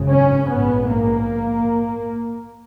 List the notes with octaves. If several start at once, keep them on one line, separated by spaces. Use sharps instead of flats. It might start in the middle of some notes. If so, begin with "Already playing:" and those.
Already playing: G#1 F#2 C#3
C#4
A#1 G#2 B3
A#3